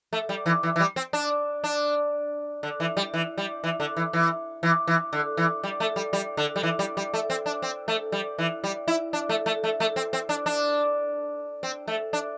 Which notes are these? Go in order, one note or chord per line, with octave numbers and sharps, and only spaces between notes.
A3
G3
E3
E3
E3
G3
C4
D4
D4
D3
E3
G3
E3
G3
E3
D3
E3
E3
E3
E3
D3
E3
G3
A3
G3
G3
D3
G3
E3
G3
G3
A3
C4
D4
C4
A3
G3
E3
G3
E4
D4
A3
A3
A3
A3
C4
C4
D4
D4
C4
A3
D4